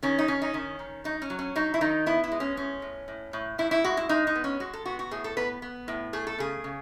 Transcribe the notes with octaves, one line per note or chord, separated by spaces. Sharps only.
D#3 C#4
D#4
D#3 C#4
D#4
D#3 C#4
D#3
F#3 D#4
C#4
F#3
C#4
F#3 D#4
E4
D#3 D#4
B3 E4
E4
G#3
C#4
A2 C#4
A2
A2
A2
A2 E4
E4
G#3 F#4
E4
G#3 D#4
D#4
B3
C#4
G#3 F#4
A4
B3 F#4
F#4
A2 G#4
A4
B3 B4
B3
A2
A3 G#4
A4
C#3 G#4
C#3